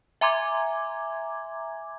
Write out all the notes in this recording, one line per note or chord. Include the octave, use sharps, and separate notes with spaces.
E5 G#5 A#5 C6 D6 G#6